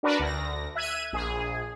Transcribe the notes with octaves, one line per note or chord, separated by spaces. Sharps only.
D4 F#4 A#4 B4 D5
D2 A#6
E5 F#6 G#6 D#7
A#1 G#4